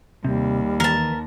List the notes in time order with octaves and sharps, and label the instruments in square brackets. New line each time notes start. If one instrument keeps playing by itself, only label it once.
[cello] D#2 [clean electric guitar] C3 [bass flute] G3
[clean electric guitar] E2 D#3 B4 [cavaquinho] A#4 A5